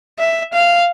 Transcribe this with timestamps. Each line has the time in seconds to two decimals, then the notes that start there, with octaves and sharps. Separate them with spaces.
0.19 E5
0.53 F5